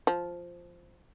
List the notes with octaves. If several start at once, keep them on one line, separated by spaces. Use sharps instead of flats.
F3